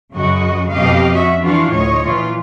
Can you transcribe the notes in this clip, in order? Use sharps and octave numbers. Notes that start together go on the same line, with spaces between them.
F#2 C#3 F#4 D#5
F2 B2 G4 D#5 F5
C#4 F#4 E5
E3 D4 F4 F#4 F5
D2 A2 C#5 D#5
A#2 E3 F4